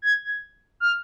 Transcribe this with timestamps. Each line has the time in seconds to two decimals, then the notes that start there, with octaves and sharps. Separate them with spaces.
0.02 G#6
0.25 G#6
0.80 F6